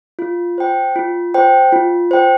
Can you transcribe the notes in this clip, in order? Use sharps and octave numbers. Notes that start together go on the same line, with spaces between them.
F4
C5 G5
F4
C5 G5
F4
C5 G5